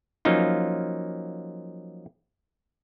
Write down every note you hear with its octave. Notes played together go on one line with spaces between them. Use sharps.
F3 F#3 A#3 C#4 D#4 F4